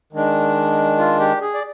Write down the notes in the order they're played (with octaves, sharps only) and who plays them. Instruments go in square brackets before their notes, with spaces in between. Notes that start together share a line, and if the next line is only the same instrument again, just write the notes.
[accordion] D#3 G#3 D4
F4
G4
G#4
D5